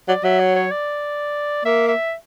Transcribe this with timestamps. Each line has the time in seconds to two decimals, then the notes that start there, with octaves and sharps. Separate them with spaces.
0.08 F#3 D5
0.24 F#3 E5
0.40 C#5
0.56 C#5
0.71 D5
1.65 A#3 E5
1.88 E5